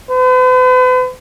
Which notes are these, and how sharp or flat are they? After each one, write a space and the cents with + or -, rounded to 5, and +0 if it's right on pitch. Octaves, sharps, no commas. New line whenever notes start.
B4 +45